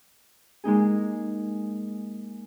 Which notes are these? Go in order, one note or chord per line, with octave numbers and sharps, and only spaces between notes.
G#3 A#3 D#4 G#4